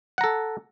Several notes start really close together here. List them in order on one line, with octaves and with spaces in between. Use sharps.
F#5 A#5 A4